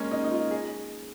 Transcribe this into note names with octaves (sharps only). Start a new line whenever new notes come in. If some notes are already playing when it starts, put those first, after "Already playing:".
Already playing: G#3 A#3 C#4
D#4
D#4
F4
G#4